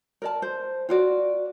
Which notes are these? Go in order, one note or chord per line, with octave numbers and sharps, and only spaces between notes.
A#4 D5 A5
C5
F4 F#4 D5